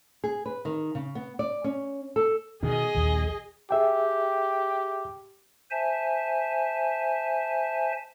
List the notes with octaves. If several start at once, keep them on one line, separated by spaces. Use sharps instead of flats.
G#4
B4
D#3
C#3
B3
D5
C#4
A4
B2 D#3 G#4 D#5
A#1 D#2
G4 G#4 E5 G5
C5 E5 G#5 A5